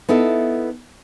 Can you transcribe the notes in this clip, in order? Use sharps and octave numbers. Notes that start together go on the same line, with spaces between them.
B3 D#4 E4 A4